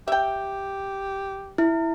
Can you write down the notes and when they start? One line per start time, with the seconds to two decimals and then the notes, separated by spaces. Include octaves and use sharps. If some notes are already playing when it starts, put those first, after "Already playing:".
0.08 G4 E5 G5
1.58 E4